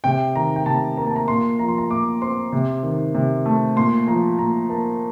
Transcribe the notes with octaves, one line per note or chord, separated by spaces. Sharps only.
C3 G5
D#3 A#5
G5
C3 A5
A#3 A#5
A5
A#5
A#2 C6
F3 A#5
C6
A#5
A#2 D6
C4 C6
C3
D#3
C3
A3
A#2 C6
F3 A#5
A#2 A#5
A#3 A5